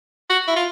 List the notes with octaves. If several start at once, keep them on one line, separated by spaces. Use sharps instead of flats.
F#4
E4
F4